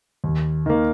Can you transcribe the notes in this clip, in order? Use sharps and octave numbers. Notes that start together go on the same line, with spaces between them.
D#2
D#3 A#3